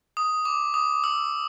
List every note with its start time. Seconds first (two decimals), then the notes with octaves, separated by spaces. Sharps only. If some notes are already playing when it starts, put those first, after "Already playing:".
0.17 D#6
0.45 D6
0.74 D#6
1.04 E6